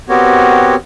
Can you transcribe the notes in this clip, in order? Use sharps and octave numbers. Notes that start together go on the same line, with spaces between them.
B3 C4 F#4 G4 A#4 C#5